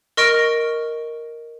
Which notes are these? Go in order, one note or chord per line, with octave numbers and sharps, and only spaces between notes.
A#4 D#5 C#6 F6 A#6 D7